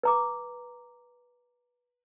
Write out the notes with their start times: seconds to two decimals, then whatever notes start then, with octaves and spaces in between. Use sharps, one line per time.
0.03 B4 A#5 D6